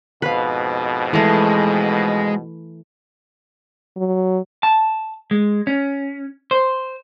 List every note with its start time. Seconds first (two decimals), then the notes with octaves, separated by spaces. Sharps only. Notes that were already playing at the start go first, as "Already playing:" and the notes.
0.22 F2 G#2 B2 B4 F5
1.14 E3 G#3 A3
3.97 F#3
4.63 A5
5.31 G#3
5.67 C#4
6.51 C5